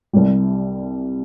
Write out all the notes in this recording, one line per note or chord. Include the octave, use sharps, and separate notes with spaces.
C2 C3 G3